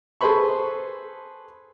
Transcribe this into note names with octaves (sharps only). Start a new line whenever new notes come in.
G#4 A4 B4 C5 B5 C#6